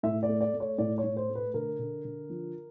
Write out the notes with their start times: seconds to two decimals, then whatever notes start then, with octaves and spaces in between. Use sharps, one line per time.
0.03 A2 E5
0.23 D5
0.29 A3
0.41 D5
0.54 A3
0.60 C#5
0.78 A2 D5
0.98 C#5
1.04 A2
1.17 C5
1.29 A3
1.35 B4
1.54 D3 A#4
1.79 D3
2.05 D3
2.30 F3